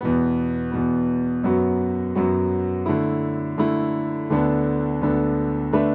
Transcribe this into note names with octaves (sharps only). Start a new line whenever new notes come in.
E2 B2 B3
E2 B2 B3
F#2 F#3 B3 F#4
F#2 F#3 B3 F#4
D3 A3 E4
D3 A3 E4
D2 D3 B3 D4 A4
D2 D3 B3 D4 A4
D3 A3 D4 B4 E5